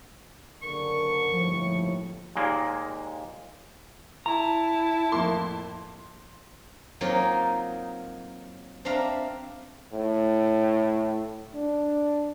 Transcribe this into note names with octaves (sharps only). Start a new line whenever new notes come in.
F#1 D3 A#4 C#6
G1 D#2 A2 F3
D#2 A#2 G#3 A#3
E4 A5 A#5
F2 A2 A#3 C6
F#3 A#3 C4 D#4 F4
C4 D4 E5 F5 A#5
A2
D4